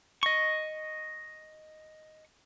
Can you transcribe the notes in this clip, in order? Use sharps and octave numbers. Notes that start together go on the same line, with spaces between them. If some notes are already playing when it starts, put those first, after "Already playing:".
D#5 C#6